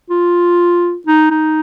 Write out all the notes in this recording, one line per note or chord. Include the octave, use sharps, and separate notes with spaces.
F4
D#4
D#4